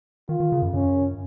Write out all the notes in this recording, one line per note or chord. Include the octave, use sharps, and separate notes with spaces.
D#3 F4
D#3
C#3
F#2
F#2 C#4